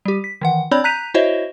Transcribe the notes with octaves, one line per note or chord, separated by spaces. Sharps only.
G3 G4
B6
D#3 E3 F#5
C4 D4 C#5 D5 B5 G6
A#5 F#6 G6 B6 D#7 F7
E4 F#4 C5 C#5 D#5 E5